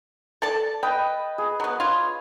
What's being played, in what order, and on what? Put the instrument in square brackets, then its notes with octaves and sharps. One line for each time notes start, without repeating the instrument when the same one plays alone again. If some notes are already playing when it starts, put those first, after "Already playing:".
[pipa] A4 D5 A5
[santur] B4 D#5 A5 [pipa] G5
[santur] G#4
[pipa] F#3 B3
F4 C#5